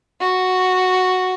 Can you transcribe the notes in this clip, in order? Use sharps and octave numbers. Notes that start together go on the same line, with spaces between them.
F#4